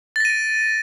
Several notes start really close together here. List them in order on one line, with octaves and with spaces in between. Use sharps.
A6 A#6 D#7 D7